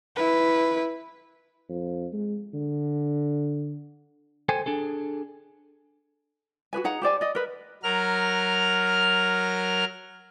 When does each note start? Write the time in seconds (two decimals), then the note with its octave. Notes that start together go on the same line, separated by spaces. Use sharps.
0.16 E4 B4
1.69 F2
2.13 G#3
2.54 D3
4.49 A4 C5 G5 G#5
4.66 D4 G#4 A4
6.73 F#4 G#4 B4 G#5
6.84 D#4 G#4 F#5 A#5
7.02 G4 C5 D5 G#5
7.21 D5 D#5
7.35 A#4 B4
7.83 F#3 A#4 F6